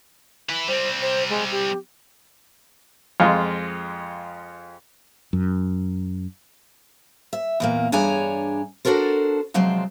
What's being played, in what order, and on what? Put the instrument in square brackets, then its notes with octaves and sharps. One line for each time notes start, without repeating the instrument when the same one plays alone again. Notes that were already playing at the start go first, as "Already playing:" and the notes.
[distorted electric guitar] E4 B4
[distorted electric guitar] G3 C4 [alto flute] C5
[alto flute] C5
G#3
G4
[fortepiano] F2 G#3 F4
[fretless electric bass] F#2
[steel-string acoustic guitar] E5
E2 A#2 A#3
G2 D4 G#4 C#5 G#5 A#5
D4 F#4 A4 A#4 C5
C3 F3 F#3 G#3 C4